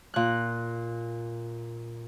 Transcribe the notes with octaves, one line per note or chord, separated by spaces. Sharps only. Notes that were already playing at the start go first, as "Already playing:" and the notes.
A#2 F#6